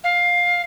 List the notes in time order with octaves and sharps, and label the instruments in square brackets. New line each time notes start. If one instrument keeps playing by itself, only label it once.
[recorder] F5